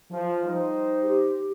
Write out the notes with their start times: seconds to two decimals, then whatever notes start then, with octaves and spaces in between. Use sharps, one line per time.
0.11 F3
0.44 G3 D#4 C5
1.02 G4